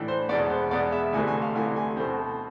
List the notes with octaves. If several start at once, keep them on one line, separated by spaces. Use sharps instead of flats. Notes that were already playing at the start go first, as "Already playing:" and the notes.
Already playing: A2 E3 D4
C5
E2 B2 G#3 B3 D5
C5
E2 B2 G#3 B3 D5
E5
D2 C3 E3 A3 G#5
G#5
F5
D2 C3 E3 A3 G#5
G#5
B2 A3 C4